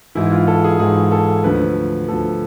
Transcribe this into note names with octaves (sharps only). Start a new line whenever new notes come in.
G#2 E3 E4
F4
A4
G#4
G#2 E3 G#4
A4
D2 D3 F3 B4
D2 D3 F3 A4